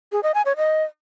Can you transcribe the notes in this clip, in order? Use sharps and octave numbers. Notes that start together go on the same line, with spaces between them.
G#4
D#5
G#5
C#5
D#5